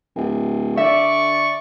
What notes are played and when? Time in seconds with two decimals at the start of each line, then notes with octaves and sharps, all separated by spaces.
0.15 D1
0.77 D3 D5 E5 C#6